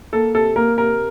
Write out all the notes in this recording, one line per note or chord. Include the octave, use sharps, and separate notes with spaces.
A#3 A4
C3 A4
A#3 A#4
C3 A#4